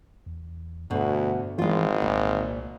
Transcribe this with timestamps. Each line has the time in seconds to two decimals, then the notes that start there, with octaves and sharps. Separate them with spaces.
0.26 E2
0.91 D2 G2 B2
1.58 G#1 E3 G#3 F4
2.02 C2 A#2